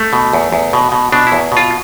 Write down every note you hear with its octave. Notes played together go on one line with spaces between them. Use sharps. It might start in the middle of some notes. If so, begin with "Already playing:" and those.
Already playing: A3
B2
E2
E2
B2
B2
B2 D4
E4
E2
B2 F4